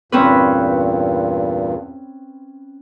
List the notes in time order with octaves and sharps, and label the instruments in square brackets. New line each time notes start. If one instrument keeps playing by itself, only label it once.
[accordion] E2 G2 A#2 [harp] C4 C#4 B4